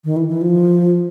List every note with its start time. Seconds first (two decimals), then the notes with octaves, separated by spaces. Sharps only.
0.04 D#3
0.17 E3
0.29 E3
0.41 F3